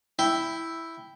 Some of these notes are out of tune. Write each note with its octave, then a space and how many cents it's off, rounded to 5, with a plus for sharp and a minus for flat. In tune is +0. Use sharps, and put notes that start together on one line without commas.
E4 +0 G5 +0